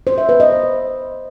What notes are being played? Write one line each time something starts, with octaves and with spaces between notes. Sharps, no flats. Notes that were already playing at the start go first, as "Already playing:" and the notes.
C5
E5
B4
D#5